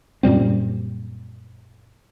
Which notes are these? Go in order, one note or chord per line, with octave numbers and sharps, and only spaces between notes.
F#2 A#2 G3 C4